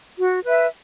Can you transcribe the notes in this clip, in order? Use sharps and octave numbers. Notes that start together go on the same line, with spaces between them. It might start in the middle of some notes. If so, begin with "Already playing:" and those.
F#4
B4 E5